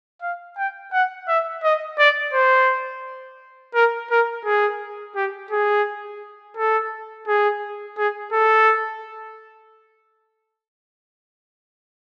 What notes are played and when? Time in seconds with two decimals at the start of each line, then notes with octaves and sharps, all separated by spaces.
0.22 F5
0.58 G5
0.93 F#5
1.28 E5
1.64 D#5
1.99 D5
2.34 C5
3.74 A#4
4.11 A#4
4.45 G#4
5.16 G4
5.51 G#4
6.57 A4
7.27 G#4
7.98 G#4
8.33 A4